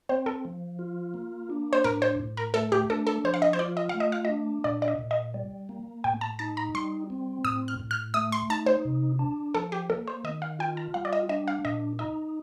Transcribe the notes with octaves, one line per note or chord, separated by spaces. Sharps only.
C4 C5
A4
F3
F4
A#3
D4
C5
A2 A#4
C5
A2
A#4
A3 A4
G4
D4 A4
A4
F3 C5
F5
D#5
C5
F4 D5
D#5
A3 F5
D#5
F5
D4 D#5
A#2 D5
D5
D#5
A#2
D#5
G3
A#3
A2 G5
A5
D#4 A5
A#5
G3 C6
C4
A2 D#6
F6
A2
F6
A3 D#6
C6
D#4 A5
C5
C3
D4
F3 A4
G4
A#3 A4
C5
D#3 D#5
F5
F4 G5
A5
G3 F5
D5
D#5
D4 D#5
F5
A#2 D#5
D#4 D#5